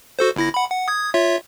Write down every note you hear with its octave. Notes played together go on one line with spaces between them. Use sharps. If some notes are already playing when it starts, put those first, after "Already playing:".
F#4 A4 C5
G1 E4 A#6
F#5 B5
F#5
D#6 G#6
F4 C#5 E5